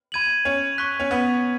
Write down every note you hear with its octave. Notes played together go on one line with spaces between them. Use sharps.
B5 G#6 D#7 F#7
C#4
C#6 F#6 B6
C#4
B3